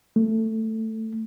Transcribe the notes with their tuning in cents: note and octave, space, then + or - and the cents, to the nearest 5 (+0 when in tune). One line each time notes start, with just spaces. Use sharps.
A3 +10